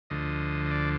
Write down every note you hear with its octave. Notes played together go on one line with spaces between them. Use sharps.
D2 D3 F3 D#5
D#5
D5